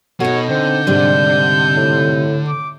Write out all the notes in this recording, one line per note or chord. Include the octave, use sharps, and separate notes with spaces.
B2 D#4 F#4 A4 C#5
D3 C4 G6
G#2 C3 G3 D4
A2
D6